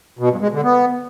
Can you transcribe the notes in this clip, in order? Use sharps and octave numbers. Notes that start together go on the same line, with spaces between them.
B2
G2
G#3
D3
B3